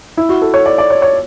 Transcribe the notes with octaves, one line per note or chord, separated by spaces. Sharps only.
E4
F#4
A4
C#5
D5
D5
C#5
C#5